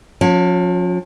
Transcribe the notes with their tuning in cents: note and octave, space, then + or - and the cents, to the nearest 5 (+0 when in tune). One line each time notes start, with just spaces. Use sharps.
F3 +40 C#4 -10